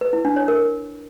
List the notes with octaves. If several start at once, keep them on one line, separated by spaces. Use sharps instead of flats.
B4
E4
D4
C#5
A#4